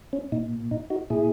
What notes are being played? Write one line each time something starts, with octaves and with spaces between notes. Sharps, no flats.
C#4
A#2 D#4
D#4
D#4 F#4
A#2 E4 G#4